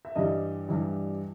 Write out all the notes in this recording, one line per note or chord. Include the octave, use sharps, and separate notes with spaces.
E5
G2 E3 G3 D#5
G2 E3 G3